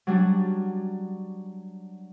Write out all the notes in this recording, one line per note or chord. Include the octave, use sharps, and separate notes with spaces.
F#3 G3 D4